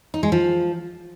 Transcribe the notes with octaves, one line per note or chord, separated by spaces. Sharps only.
D#4
G#3
F3